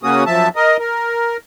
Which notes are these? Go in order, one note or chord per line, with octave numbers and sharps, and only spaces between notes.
C#3 A#3 C#4 F#4 D#6
F#2 F3 E5 A5
A#4 D#5
A#4